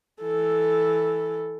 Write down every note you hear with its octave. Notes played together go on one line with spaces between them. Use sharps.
E3 A4